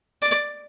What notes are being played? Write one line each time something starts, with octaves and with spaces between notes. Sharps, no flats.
D5